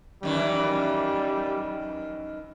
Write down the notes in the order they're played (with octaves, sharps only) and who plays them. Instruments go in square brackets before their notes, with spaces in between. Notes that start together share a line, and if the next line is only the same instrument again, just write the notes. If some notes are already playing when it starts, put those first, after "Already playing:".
[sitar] F#2 D#3 E3 [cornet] G3